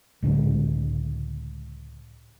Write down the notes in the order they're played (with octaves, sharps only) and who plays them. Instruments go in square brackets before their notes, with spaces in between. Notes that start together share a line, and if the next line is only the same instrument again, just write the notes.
[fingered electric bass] C#2 A2 D3 G#3